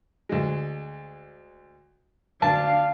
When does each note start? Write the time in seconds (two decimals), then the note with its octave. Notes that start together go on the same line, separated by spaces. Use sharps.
0.29 D2 G#3
2.42 D2 D4 F5 A5